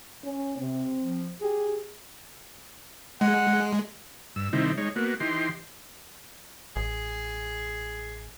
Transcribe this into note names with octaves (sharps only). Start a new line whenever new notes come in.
C#4
C3 C4
F3
G4 G#4
G#3 F#5
G2 E6
C3 D#3 G3 C4 D#4 E4
G#3 D#4 C#5
A#3 B3 F#4
E3 D#4 G4 C6
A1 G#4